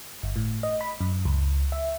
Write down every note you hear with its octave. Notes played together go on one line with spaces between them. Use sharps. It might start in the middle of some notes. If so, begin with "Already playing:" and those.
G1
A2
D#5
B5
F#2
C#2
E5